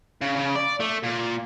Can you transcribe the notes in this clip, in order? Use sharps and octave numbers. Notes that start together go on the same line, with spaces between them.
C#3
C#3
D5
A3
A#2